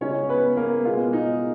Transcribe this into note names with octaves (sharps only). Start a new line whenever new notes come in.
C#3 G#3 C#4 D#4 C#5
B3 B4
A#3 A#4
B2 G#3 B3 F4
D#4